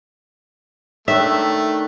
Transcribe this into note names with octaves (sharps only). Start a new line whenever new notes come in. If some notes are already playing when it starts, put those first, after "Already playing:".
D#3 A3 D4 E5